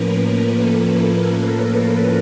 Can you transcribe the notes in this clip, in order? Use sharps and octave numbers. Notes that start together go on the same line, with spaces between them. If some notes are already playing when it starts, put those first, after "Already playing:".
Already playing: A2 F3 A#3 C#4 A#4 B4
A4
A#4